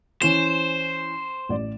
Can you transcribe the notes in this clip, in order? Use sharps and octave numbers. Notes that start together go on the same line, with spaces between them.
E3 C#4 C5 E7 F7
A1 D5